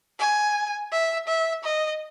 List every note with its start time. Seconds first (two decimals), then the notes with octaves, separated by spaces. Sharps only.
0.19 G#5
0.92 E5
1.28 E5
1.64 D#5